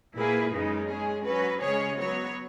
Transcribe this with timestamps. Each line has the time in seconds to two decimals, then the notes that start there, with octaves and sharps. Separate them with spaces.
0.15 A#2 A#3 E4 G#4 B4
0.53 F#2 C#3 G#3 D#4
0.89 G#3 C#4 G#4
1.26 F#3 C#4 F#4 B4
1.62 C#3 G#3 C#4 G#4 C#5
1.99 F#3 B3 F#4 C#5